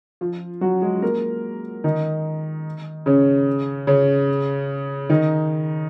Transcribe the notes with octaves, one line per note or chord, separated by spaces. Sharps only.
F3 F4
F#3 F#4
G#3 G#4
A#3 A#4
D#3 D#4
C#3 C#4
C#3 C#4
D#3 D#4